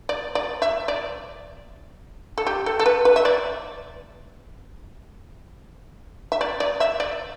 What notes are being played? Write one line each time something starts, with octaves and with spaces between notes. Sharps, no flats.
D5
D5
E5
D5
A4
G4
A4
A4
B4
B4
E5
D5
E5
D5
D5
E5
D5